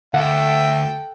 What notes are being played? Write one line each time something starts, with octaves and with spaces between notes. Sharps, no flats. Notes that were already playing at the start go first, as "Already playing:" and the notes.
D2 A4 E5 F#5 G5